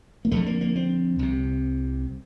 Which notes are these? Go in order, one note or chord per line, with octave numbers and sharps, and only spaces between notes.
A#3
F2 D3 A3
A#3
A#3
C4
C2 C3